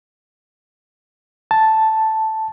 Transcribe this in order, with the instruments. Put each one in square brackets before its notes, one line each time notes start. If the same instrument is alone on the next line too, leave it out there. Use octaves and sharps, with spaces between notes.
[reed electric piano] A5